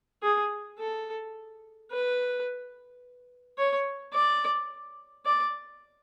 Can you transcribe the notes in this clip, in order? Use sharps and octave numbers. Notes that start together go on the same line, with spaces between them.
G#4
A4
B4
C#5
D5
D5